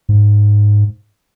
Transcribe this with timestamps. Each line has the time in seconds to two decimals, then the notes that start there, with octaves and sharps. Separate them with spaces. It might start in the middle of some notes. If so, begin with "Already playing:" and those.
0.09 G#2